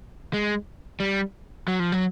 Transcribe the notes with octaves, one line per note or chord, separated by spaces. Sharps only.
G#3
G3
F#3
F3
F#3